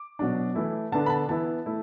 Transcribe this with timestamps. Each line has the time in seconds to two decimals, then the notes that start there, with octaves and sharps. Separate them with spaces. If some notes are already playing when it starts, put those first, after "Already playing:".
Already playing: D6
0.19 B2 F#3 D4
0.55 E3 A3 E4
0.92 D3 B3 D4 A5
1.06 B5
1.10 A5
1.29 E3 B3 E4 A5
1.66 A3 E4